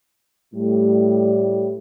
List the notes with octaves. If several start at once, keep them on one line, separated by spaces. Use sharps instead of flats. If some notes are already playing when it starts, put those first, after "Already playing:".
A2 G3